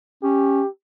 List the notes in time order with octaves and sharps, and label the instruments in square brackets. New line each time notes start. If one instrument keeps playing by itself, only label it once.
[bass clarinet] C#4 [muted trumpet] G4